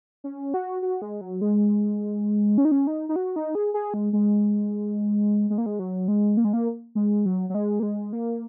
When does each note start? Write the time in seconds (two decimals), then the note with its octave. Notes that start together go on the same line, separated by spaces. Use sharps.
0.24 C#4
0.54 F#4
0.82 F#4
1.02 G#3
1.21 F#3
1.41 G#3
2.58 C#4
2.65 D#4
2.72 C#4
2.87 D#4
3.09 D#4
3.16 F#4
3.36 D#4
3.55 G#4
3.74 G#4
3.94 G#3
4.13 G#3
5.50 G#3
5.58 A#3
5.66 G#3
5.79 F#3
6.08 G#3
6.37 A#3
6.45 G#3
6.53 A#3
6.95 G#3
7.26 F#3
7.50 F#3
7.55 G#3
7.80 A#3
7.83 G#3
8.13 A#3